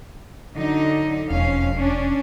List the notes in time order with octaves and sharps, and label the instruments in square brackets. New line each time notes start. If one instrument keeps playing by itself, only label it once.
[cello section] D3 F#3 D#4
[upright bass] E1 [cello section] F2 C#4 F5
[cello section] C#4 D4